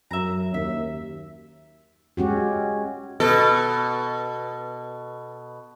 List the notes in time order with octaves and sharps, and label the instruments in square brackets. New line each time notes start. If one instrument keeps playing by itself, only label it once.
[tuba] F#2 [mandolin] E5 A#5
[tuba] D#2 [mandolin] E5
[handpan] G#3 C#4 F#4 G4
[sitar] B2 A4